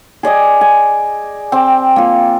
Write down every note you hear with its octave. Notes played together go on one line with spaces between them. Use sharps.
G#4 D5 D#5 G#5
G#5
C4 G5 D6
A#3 F4